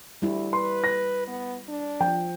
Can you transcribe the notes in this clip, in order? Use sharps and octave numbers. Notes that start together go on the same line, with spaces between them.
D2 G3 E4
B4 C6
A#6
B3
D4
F3 G5